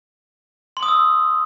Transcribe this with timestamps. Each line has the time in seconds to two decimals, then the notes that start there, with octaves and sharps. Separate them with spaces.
0.77 C6
0.83 D#6
0.88 E6